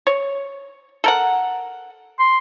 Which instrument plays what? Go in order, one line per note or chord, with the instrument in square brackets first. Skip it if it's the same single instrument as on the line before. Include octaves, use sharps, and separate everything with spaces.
[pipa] C#5
A4 A#4 F#5
[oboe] C6